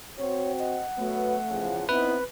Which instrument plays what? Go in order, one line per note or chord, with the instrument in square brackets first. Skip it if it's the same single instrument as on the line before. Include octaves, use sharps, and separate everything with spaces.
[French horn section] C4 F#4 [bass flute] C#5
[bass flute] D#5 [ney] F#5
[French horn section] F#3 B3 [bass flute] A3
[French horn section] E2 C#3 F3
[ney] B3 [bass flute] C4 [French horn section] D#4 E4 [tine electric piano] B4